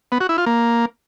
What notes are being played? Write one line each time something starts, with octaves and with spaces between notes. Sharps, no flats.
B3
F#4
E4
F4
A#3